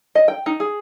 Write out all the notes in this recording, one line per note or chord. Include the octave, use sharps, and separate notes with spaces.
D#5
G5
D#4
G#4